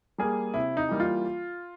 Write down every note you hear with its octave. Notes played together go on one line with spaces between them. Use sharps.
G3 A#3 G#4
C3 E4
D#4
E3 G3 A#3
F4